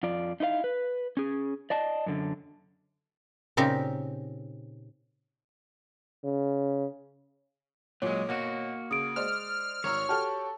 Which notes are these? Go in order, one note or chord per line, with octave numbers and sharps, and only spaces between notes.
F2 F4 D5
D#4 E4 B4 F5
B4
C#4 G#4
D5 D#5 A5
F#2 D3
A#2 C#3 C4 D#4 G4
C#3
A#2 F#3 G#3 C#5
B2 A#3 F#4 F#5
C#3 D#6 D7
G#3 C5 D5 F6
G#1 C#5 A#5 E6
F#4 G4 A4 A5